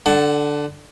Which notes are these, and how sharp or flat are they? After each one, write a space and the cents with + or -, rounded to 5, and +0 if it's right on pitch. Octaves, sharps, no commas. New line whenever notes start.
D3 +0 F#5 +25 A5 +0